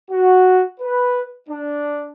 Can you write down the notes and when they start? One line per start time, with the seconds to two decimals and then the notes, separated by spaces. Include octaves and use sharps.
0.10 F#4
0.80 B4
1.49 D4